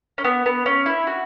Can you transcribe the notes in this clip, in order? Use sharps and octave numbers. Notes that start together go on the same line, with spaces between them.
C#4
B3
B3
C#4
E4
F#4